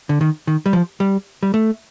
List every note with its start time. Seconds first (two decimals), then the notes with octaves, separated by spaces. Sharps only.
0.09 D3
0.21 D#3
0.47 D#3
0.66 G3
0.73 F3
1.00 G3
1.43 G3
1.54 A3